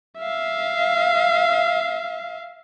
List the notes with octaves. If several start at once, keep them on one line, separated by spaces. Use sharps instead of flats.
E5 F5